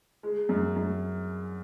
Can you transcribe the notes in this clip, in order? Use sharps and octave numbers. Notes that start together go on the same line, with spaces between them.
G#3
F#2
F#2